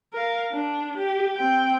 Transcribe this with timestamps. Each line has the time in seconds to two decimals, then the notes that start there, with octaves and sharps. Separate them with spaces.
0.13 A#4 F5
0.52 D4
0.98 G4
1.35 C4 G5